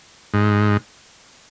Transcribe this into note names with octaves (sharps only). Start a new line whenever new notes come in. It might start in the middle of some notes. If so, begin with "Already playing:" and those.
G#2